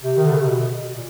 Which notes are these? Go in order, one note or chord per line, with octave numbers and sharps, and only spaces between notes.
C3
D#3
D3
C#3
C3
B2
A#2